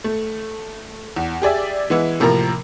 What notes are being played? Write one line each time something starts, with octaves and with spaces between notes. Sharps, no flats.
A3
E2
G4 G#4 D5 E5
E3 G#3 B3 E4
A2 C3 F3 A#3 A#4 A#5